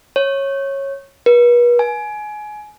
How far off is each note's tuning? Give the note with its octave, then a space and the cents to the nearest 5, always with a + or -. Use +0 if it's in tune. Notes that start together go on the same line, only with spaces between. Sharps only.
C#5 -15
B4 -40
G#5 +25